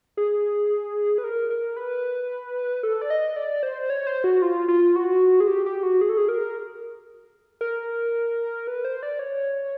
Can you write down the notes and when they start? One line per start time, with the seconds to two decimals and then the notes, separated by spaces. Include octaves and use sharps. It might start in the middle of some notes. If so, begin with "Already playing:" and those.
0.17 G#4
1.18 B4
1.24 A#4
1.50 A#4
1.77 B4
2.83 A4
3.02 D5
3.10 D#5
3.36 D5
3.63 C5
3.90 C#5
4.07 C5
4.24 F#4
4.42 F4
4.68 F4
4.96 F#4
5.40 G#4
5.48 G4
5.66 G4
5.83 F#4
6.01 G#4
6.09 A4
6.17 G#4
6.29 A#4
7.61 A#4
8.67 B4
8.85 C5
9.03 D5
9.19 C#5